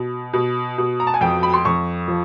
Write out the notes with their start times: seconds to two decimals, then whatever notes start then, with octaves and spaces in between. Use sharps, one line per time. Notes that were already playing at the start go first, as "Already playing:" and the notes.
Already playing: B2
0.33 B2
0.78 B2
1.00 A#5
1.07 A5
1.14 G#5
1.21 F2 G5
1.43 B5
1.54 C6
1.65 F2 C#6
2.08 F3